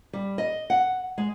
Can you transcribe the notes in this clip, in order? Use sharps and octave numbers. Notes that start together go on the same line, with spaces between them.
G3
D#5
F#5
G#3